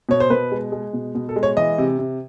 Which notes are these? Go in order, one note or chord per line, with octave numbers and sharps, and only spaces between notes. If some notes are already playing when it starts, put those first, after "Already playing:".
B2 C#5
C5
B2 B4
G#3
G#3
B2
B2
A4
G#3
C#5
E3 D#5
C3
C3